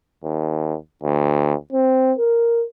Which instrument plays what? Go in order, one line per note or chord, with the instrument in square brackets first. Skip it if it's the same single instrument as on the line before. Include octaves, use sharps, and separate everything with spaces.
[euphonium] D#2
D2
C4
A#4